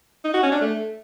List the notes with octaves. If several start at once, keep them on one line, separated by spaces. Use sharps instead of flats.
D#4
F#4
C#4
D4
A3